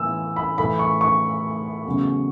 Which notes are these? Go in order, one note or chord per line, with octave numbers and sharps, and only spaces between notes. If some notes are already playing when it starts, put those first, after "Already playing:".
Already playing: A2 E3 B3 E6
B5
A2 E3 A3 B5
C#6
C#6
E2 C#3 F#3 A3